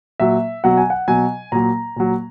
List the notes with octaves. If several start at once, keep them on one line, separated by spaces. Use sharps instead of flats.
A#2 F#3 E5
B2 F#3 F#5
G#5
F#5
B2 F#3 G#5
A#2 F#3 A#5
A#2 F#3